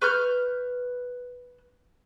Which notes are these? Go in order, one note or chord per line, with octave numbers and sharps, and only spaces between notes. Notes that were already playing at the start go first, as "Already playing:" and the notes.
B4 C#6 F6 G6